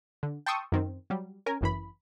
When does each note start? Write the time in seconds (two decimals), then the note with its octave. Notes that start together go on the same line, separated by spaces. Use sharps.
0.23 D3
0.46 G5 A5 C6 C#6 D#6 E6
0.72 F#2 D#3 C4
1.10 F#3 G3
1.46 C#4 A#4 G#5
1.61 G1 F#2 E3 B5